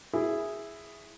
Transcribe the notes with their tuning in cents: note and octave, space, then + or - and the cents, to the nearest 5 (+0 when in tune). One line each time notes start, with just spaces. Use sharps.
E4 +0 G#4 -5